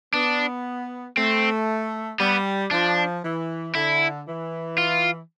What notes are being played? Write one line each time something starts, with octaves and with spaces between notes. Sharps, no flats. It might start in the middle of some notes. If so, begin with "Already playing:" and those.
B3 D4
A3 C4
G3 B3
F3 D4
E3
D3 E4
E3
F4